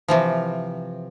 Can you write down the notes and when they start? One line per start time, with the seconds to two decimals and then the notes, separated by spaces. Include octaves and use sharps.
0.08 C3 E3 F3